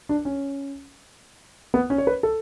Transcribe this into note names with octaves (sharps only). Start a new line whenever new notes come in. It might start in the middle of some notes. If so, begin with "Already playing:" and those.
D4
C#4
B3
C#4
C#5
B4
A4